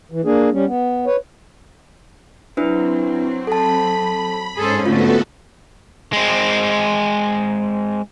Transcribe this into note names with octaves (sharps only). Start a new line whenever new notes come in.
E3
A#3 D4 G#4
G3 C#4
B3
B4 C#5
F#3 C4 D4 E4 B4
A4 A5 B5
G#2 C#4 G#4 A4 C5
D3 A3 B3 C4 F4 F#4 A4
G#3 C4